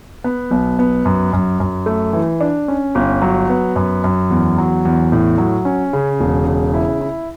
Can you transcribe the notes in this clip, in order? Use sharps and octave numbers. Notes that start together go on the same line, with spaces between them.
B3
B1
B3
F#2
F#2
F#2
A3
E3
D4
C#4
G1
F#3
B3
F#2
F#2
E2
F#3
E2
A2
F#3
C#4
C#3
E1
C#3
E4
E4